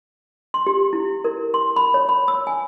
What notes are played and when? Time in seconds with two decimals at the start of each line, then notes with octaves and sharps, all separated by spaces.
0.54 C6
0.67 G4
0.93 E4
1.24 A#4
1.54 C6
1.76 B5
1.94 C#5
2.09 B5
2.28 E6
2.47 G#5